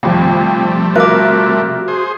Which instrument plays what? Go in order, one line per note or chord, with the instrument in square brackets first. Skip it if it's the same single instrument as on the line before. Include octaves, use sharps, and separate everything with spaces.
[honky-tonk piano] G#1 F2 [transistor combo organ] C3 G3 A3 [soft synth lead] F3
[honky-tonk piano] F3 A#4 E5 [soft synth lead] F#4 [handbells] D6 F#6
[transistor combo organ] G#4 C5